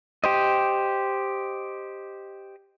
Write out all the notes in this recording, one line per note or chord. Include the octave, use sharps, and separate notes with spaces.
G4 C5 D#5